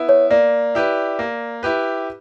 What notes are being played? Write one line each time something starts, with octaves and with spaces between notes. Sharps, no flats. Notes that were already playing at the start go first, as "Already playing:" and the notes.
Already playing: B3 E4
C#5
A#3 D5
E4 G4 B4
A#3
E4 G4 B4